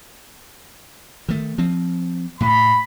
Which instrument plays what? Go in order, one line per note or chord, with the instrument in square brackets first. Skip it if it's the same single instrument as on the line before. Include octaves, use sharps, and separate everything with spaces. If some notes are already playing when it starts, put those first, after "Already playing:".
[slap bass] D#3 A3
F3 C4
[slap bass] A2 [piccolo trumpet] B5